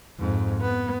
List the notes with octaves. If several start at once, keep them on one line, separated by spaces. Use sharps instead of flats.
F2 G#2
B3